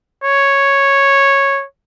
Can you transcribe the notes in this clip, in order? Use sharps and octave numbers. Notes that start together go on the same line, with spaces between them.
C#5